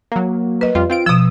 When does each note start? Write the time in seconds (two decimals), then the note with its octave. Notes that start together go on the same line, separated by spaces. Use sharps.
0.12 F#3 A#3
0.61 B4 D#5
0.75 F2 G3 F4
0.90 C4 F4 D7
1.06 B2 F3 D#6 E6